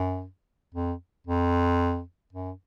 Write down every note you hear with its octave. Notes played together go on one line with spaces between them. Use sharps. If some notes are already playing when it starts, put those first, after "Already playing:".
Already playing: F#2
F2
F2
F#2